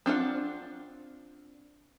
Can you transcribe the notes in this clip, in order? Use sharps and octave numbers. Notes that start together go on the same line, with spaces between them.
C4 D4 F4 F#5